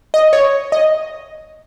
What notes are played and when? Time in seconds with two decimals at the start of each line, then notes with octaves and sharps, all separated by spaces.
0.14 D#5
0.33 C#5
0.72 D#5